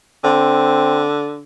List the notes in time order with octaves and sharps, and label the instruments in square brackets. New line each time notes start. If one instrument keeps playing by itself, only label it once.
[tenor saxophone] D3 [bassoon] C4